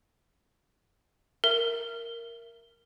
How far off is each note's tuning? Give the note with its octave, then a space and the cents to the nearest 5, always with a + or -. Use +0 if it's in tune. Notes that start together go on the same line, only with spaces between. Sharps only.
A#4 +0 E5 +25